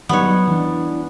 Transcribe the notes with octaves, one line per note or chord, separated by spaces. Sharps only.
F#3 G3 B3 D#4 C#5
E3 D4